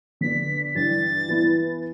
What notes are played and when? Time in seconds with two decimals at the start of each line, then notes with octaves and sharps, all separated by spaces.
0.21 D3 B3 D4 B6
0.75 G2 E3 G3 D4 A6
1.28 E3 B3 E4 B4